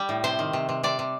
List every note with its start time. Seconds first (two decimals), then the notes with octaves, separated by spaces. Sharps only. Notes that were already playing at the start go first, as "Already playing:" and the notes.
Already playing: G3
0.09 A2
0.24 C3 C5
0.39 D#3
0.53 C3
0.69 C3
0.83 C3 D5
0.99 C3